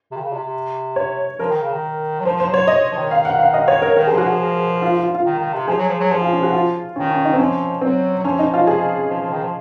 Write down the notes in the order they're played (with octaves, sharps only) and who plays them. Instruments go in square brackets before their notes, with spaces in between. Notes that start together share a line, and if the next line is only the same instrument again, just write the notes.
[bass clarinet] C3
D#3
C#3
C3
C3
[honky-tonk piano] C#5
[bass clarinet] F3 [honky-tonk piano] A#4
[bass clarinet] D#3
C#3
D#3
F#3
[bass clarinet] F3 [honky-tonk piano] C5
[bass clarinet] F3 [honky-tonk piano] C5
[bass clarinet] F#3
[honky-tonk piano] C#5
D#5
[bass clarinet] F3
D#3
[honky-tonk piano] F5
F#5
F5
D#5
C#5
A#4
[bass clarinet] D#3 [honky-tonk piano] A#4
[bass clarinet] F3 [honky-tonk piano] G#4
[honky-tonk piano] F#4
[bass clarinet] F3 [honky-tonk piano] G#4
[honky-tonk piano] F4
F4
F4
F4
[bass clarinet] D#3
D#3
C3
[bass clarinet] F3 [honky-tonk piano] G#4
[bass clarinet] F#3
F3
F#3
[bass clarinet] F3 [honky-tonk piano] G#4
[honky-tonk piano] F4
C#4
F#4
F4
[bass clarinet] D#3 [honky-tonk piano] C#4
[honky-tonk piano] C#4
D#4
C4
[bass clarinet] F3 [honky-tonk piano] C#4
[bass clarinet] F#3 [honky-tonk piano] C4
[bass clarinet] F#3
[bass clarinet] F3 [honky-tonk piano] C#4
[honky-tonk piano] D#4
F4
G#4
[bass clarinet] F3
F3
D#3
F3